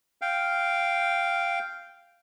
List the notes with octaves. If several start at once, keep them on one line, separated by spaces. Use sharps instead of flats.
F5 G5